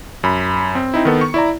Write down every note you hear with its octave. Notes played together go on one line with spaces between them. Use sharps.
F#2 B5
C4
C4 D#4 E4
D#3 B3 A4
C#6
E4 D5 A#5